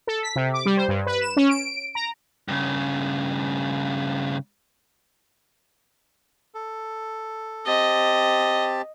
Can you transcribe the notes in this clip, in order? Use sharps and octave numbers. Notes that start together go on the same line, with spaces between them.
A4
B6
C3
D6
G3
C5
G2
B4
E7
C#4
D7
A#5
G2 C#3
A4
C4 G4 D#5 A5